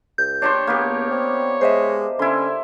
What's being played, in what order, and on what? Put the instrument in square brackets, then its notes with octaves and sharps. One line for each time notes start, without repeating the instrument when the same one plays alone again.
[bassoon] C#2 [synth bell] G6
[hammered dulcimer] D4 G4 C5 [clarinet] C#5
[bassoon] C#2 [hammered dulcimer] A#3 B3 G4
[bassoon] C4
[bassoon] G#3 [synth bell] C5 D#5 E5
[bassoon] D3 [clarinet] C#4 [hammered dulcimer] E4 C6